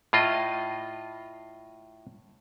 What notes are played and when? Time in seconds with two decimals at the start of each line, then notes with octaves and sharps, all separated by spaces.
0.13 A2 F4 D#5